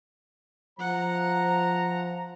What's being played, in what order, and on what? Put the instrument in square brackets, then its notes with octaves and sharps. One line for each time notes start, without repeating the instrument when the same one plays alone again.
[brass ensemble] F3 C5 A#5 [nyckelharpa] F#5